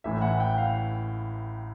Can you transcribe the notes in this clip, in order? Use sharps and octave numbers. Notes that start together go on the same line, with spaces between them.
A1 A2 E3 E5
F#5
G5
F5